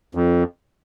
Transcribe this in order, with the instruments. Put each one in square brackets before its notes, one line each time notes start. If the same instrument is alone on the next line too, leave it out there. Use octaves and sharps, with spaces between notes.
[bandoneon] F2